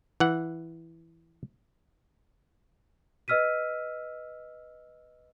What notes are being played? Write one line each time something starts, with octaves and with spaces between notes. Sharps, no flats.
E3 F#5
B4 D#5 E6 F6 B6 D#7